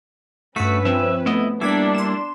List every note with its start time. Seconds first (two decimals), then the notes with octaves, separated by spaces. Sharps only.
0.56 G2 A3 C#4 F#4 B4 E6 B6
0.85 F3 C4 E5
1.26 A3 B3 E4 D#5
1.61 G3 A#3 D4 E4 D6 G#6 B6
1.95 C6 E7